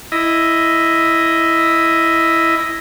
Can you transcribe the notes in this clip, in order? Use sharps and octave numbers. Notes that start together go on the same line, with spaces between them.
E4 D#5